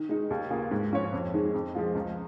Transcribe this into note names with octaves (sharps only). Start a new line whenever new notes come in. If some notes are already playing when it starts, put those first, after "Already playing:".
Already playing: D#3
G#3 D#4
D#2
C#3 A#3 F4 G#4
G#2
F3 C#4 F4 C#5
F2
D#3 G#3 D#4
F2
F3 G#3 F4
C#2